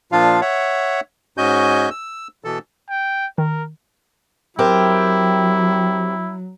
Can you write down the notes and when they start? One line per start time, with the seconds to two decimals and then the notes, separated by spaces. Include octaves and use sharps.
0.12 A#2 F3 D4 F4 F5
0.41 C#5 E5 F#5
1.38 G#2 C#4 F#4 D#5 G#5 G6
1.90 E6
2.44 B2 E3 A4
2.89 G5
3.38 D#3 A#4
4.59 F#3 C4 E4 G4 A#4